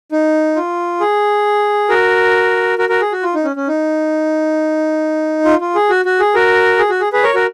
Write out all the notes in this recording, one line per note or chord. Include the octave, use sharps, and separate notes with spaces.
D#4
F4
G#4
F#4 A#4
F#4 A#4
F#4 A#4
G#4
F#4
F4
D#4
C#4
C#4
D#4
F4
F4
G#4
F#4
F#4
G#4
F#4 A#4
G#4
F#4
G#4
G#4 B4
A#4 C#5
F#4 A#4